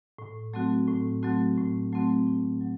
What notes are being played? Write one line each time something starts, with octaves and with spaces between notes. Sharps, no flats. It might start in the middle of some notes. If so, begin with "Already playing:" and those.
A2
F#3 A3 C4 F#4
A2
F#3 A3 C4 F#4
A2
F#3 A3 C4 F#4
A2
F#3